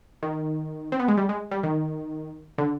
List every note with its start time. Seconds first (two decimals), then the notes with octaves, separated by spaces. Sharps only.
0.23 D#3
0.92 C4
1.00 B3
1.08 G#3
1.17 G3
1.29 G#3
1.51 G3
1.63 D#3
2.58 D3